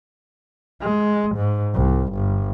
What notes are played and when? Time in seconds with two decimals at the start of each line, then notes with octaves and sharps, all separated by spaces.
0.82 G#3
1.36 G#2
1.75 C2
2.14 G1